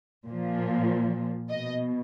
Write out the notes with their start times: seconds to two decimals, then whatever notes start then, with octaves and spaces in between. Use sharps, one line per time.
0.26 A#2 F3
1.50 B2 D#5